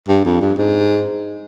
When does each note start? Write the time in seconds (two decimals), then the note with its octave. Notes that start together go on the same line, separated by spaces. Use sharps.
0.08 G2
0.25 F2
0.41 G2
0.58 G#2